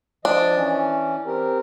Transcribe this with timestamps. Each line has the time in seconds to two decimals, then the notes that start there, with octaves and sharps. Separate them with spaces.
0.25 F3 D4 D#5
0.56 E3 C#4
1.25 C4 G4 A#4